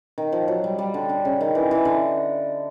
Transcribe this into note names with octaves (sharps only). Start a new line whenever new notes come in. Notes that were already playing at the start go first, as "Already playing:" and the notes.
D#3
F3
F#3
G3
G3
D3
D3
C#3
D#3
E3
E3
D3